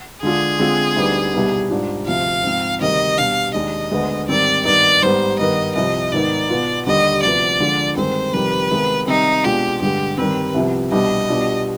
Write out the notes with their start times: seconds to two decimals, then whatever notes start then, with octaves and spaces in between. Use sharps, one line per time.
0.22 D3 G#3 D4 F4 G#4
0.59 D3 G#3 C4 F4
0.96 D2 D3 G3 B3 D#4
1.33 C2 B2 G3 B3 D#4
1.70 G#2 G3 D4 F4
2.07 D2 C3 F3 F5
2.43 G#2 F3 C4
2.81 D2 C3 D#3 G3 D#5
3.17 B2 G3 D4 F5
3.54 D#2 D#3 G#3 D4 D#5
3.91 D2 D3 G#3 B3
4.28 G#2 D#3 G3 C4 D5
4.65 G2 D#3 B3 D#4 D5
5.02 G#2 G3 B3 C5
5.39 G2 D#3 B3 D#5
5.76 C2 C3 F3 D#5
6.12 G#2 D#3 B3 D#4 D5
6.50 B2 B3 F4
6.86 D#2 D3 G3 D#5
7.23 D2 C3 F3 B3 D5
7.60 D3 F3 G#3 D4 F4
7.97 G2 D#3 G#3 C4 C5
8.33 F2 C3 D#3 G3 B4
8.71 C3 D#3 G#3 B3
9.07 C3 D#3 G3 C4 D#4
9.44 B2 G#3 D4 F4 G4
9.81 G2 D3 G#3 G4
10.18 G2 D#3 G3 C4 B4
10.54 C2 C3 F3 B3
10.91 C2 B2 G3 D4 D#5
11.29 B2 G3 D4 F4